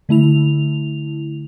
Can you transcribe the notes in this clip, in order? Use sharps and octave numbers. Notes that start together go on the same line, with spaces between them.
D3 A3 E4 F7